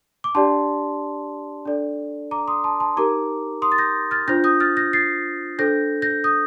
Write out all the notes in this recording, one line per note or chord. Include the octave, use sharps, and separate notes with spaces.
D6
D4 G4 D5 A5 C6
D4 A4 D5
A#5 D6
C6 D#6
A5 C6
A5 C6
D#4 G4 A#4 A#5 D6
C6 D#6
A6
G6 A#6
F6 A6
D4 F4 C5 G6 A#6
D#6 G6
F6 A6
G6 A#6
A6 C7
D4 A4 C5 G6 A#6
G6 A#6
D#6 G6